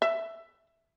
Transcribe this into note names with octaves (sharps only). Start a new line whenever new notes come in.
E5